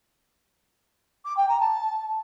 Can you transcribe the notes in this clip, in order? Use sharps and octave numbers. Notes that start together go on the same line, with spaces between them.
D6
G5
A#5
A5